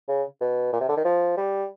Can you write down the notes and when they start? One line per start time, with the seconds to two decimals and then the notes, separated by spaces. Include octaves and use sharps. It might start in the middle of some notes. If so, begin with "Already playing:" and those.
0.08 C#3
0.41 B2
0.73 A#2
0.80 C3
0.89 D3
0.97 D#3
1.04 F3
1.37 G3